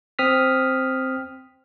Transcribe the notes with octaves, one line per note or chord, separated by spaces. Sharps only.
C4 D#6 F6 B6